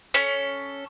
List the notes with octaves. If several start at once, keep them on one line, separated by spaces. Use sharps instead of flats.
C#4 A4